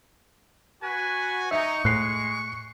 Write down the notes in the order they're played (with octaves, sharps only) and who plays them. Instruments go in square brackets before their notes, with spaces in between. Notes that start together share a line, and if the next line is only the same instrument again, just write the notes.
[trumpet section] F#4 G#5 [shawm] B4
[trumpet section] D#4 [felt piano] E5 [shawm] C#6
[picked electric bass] A2 [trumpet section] G#3 [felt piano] F#6 C7